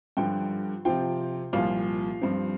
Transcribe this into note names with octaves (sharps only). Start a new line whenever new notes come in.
G2 D3 F3 G5
C3 F3 C4 F4 G5
C2 A#2 F3 F5
G2 F3 C4